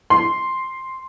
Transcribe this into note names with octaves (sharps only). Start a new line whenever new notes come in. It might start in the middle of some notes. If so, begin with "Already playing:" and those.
C6